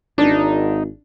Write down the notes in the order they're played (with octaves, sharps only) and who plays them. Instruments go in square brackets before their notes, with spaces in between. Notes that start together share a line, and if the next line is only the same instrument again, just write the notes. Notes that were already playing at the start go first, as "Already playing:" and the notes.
[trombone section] G#1 [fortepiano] D4 [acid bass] D#4